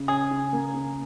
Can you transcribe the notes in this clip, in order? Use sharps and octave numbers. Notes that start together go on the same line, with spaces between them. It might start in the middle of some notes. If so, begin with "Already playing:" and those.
Already playing: C#3
C#4 G#4
C#3
A#3
C#3